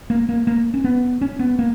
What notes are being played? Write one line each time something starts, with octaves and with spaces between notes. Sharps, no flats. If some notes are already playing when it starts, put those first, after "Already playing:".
A#3
A#3
A#3
C#4
B3
C#4
B3
A#3